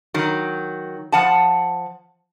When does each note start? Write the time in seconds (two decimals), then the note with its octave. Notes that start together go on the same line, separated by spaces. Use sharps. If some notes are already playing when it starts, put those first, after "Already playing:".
0.14 D#3 F#3
1.12 F3 F#5 A5